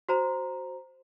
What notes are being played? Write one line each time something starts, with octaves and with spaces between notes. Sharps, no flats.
F#4 C5 A#5